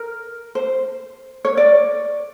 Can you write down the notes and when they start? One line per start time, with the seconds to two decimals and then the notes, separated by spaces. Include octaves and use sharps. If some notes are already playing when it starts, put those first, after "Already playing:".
Already playing: A#4
0.55 C5
1.45 C#5
1.57 D5